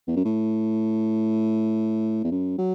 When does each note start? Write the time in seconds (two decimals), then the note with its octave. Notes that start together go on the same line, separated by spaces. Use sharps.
0.08 E2
0.16 F#2
0.25 A2
2.24 E2
2.32 F#2
2.58 F#3